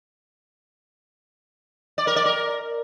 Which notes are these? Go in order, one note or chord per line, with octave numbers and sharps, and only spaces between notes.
D5
A#4
D5
A#4